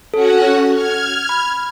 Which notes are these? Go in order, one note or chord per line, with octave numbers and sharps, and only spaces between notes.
C#4 F#4 A4 F#5
F6 G#6
B5